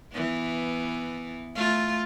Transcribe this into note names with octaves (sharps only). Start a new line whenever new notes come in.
E3 B3
A3 F4